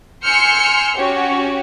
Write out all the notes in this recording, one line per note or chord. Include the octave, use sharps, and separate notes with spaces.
G#5 C6 E6 F6 G6 C#7
C#4 F#4 G4 C#5